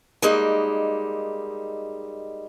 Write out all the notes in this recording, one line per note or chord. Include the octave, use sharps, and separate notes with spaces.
G3 G#3 A#3 D#4